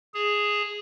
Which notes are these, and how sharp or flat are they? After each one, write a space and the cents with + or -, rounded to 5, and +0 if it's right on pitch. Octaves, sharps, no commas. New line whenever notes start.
G#4 +0 A5 +35